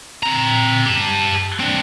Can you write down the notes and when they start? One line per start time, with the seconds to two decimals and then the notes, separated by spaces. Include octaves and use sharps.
0.23 C4 A#5
0.86 G4 A5
1.60 C4 D4